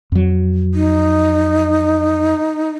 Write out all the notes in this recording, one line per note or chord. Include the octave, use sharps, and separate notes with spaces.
F2 F#3
D#4